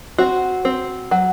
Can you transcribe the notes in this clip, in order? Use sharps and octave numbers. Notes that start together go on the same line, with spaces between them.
C4 F#4
C4
F#3